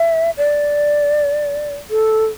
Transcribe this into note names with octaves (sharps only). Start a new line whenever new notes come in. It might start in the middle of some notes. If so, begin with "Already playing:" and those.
Already playing: E5
D5
A4